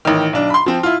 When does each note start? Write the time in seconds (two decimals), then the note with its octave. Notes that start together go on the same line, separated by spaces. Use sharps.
0.05 A1 D#3
0.33 B1 D4
0.50 B5 C6
0.66 F3 C4
0.83 E4 F4